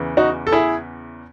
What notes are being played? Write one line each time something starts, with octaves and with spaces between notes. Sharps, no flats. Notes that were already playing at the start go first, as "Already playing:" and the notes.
Already playing: E2 C#3 E3
D#4 F#4
A4
E4 G#4